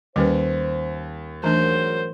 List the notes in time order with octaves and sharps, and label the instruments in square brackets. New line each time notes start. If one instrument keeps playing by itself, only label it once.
[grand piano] D#2 [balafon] G3 C#4 B4 [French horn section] C5
[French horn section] G#2 F#3 A#4 [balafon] E3 A3 D4 [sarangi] C5